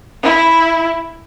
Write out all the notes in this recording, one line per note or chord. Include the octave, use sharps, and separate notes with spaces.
E4